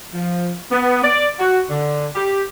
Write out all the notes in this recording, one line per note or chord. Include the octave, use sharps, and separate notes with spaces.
F3
B3
D5
F#4
D3
G4